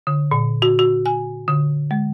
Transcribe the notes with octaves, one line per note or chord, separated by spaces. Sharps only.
D3
A#2
F#4
F#4
G#5
D3
G#3